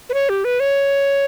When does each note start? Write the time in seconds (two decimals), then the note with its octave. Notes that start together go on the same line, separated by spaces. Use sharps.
0.09 B4
0.14 C#5
0.29 G4
0.45 B4
0.60 C#5